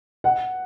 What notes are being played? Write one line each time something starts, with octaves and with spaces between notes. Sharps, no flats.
F#5